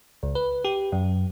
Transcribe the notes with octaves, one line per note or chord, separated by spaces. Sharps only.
C#2
B4
G4
F#2